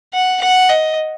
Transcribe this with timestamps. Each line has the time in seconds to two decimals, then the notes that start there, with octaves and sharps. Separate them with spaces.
0.14 F#5
0.41 F#5
0.70 D#5